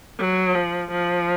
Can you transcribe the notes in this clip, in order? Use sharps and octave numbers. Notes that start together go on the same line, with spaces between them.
F#3
F3
F3